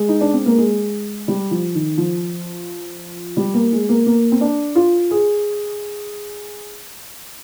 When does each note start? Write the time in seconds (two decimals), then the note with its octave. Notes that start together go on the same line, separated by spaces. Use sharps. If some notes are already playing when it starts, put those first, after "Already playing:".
Already playing: G#3
0.09 D#4
0.21 D4
0.33 C4
0.46 A#3
0.58 G#3
1.28 G3
1.51 F3
1.75 D#3
1.98 F3
3.37 G3
3.54 A#3
3.72 G#3
3.89 A#3
4.06 A#3
4.32 C4
4.41 D4
4.75 F4
5.11 G#4